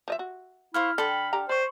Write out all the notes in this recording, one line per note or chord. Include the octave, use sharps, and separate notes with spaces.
F3 D#5 E5
F#4
E4 C5 F5 C#6 F6
D3 A4 G5 B5
D3 G4 A#5
C5 D5 C6 C#6